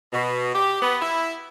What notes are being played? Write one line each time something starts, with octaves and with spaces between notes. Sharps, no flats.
B2
G4
B3
E4